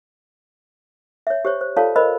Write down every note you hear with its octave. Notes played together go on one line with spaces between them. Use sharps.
C#5 E5
G4 C5 C#5
C5
F4 A4 C#5 D5 F5 A5
A#4 C5 D#5 B5